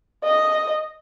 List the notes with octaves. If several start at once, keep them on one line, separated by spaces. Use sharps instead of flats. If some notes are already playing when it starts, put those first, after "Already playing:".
D#5